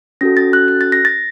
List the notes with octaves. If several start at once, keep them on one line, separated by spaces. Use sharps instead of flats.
C#4 F#4 A4 A#6
A6
F#6
F#6
A6
A#6
A6